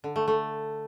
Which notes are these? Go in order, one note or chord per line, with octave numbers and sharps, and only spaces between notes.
D3
A3
A3